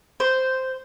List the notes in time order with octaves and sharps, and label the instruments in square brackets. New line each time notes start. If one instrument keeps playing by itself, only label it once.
[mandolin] C5